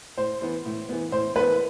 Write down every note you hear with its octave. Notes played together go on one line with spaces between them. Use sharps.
A2 C5
E3 B3
A2
E3 B3
A2 C5
E3 B3 B4